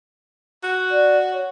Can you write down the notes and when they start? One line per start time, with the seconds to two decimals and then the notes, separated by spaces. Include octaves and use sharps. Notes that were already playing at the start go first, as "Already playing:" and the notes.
0.63 F#4
0.91 D5
1.33 C#5